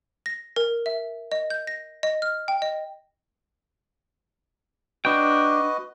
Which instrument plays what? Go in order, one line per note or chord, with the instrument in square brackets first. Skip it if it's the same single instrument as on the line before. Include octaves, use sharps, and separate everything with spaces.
[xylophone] A#6
A#4
E5
D#5
G6
A#6
D#5
F6
G5
D#5
[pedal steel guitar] D4 G5 [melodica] F#4 B4 D#5